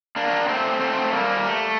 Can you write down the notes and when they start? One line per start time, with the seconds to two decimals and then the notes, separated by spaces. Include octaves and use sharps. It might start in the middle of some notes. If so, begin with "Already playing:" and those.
0.16 A#3 D4
0.48 A3 C4
0.80 A3 C4
1.13 G3 A#3
1.45 A3